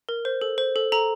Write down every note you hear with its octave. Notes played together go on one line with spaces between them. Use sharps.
A#4
C5
A4
C5
A4
A4 A#5